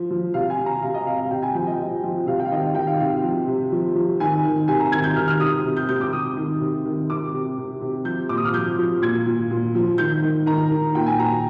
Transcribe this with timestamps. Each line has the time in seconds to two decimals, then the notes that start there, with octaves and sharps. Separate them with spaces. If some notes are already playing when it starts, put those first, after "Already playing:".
Already playing: F3
0.11 F3
0.34 C3 F5
0.50 G#5
0.59 C3
0.66 A#5
0.82 C3 F5
0.94 D#5
1.06 C3 F5
1.19 F5
1.31 C3 G5
1.43 G#5
1.55 F3 G5
1.67 D#5
1.79 F3
2.03 F3
2.27 C3 F5
2.40 G5
2.46 F5
2.51 D#3 D#5
2.63 F5
2.75 D#3 G5
2.87 F5
3.00 C3 F5
3.23 F3
3.47 C3
3.72 F3
3.95 F3
4.20 D#3 G#5
4.45 D#3
4.68 C3 G#5
4.80 A#5
4.92 D#3 G#6
5.04 G6
5.16 D#3 F6
5.28 F6
5.40 C3 D#6
5.65 C3
5.77 G6
5.89 C3 G6
6.01 D6
6.12 C3 D#6
6.37 D#3
6.60 C3
6.86 D#3
7.10 C3 D6
7.33 C3
7.58 C3
7.81 C3
8.05 F3 G6
8.29 A#2 D6
8.37 D#6
8.45 F6
8.54 F3 G6
8.79 F3
9.02 A#2 G#6
9.27 A#2
9.51 A#2
9.75 F3
9.98 D#3 G6
10.23 D#3
10.46 D#3 A#5
10.71 D#3
10.95 A#2 G5
11.06 G#5
11.19 A#2 A#5